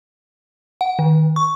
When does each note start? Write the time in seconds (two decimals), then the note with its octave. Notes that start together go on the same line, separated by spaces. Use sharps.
0.81 F#5
0.99 D#3
1.36 C#6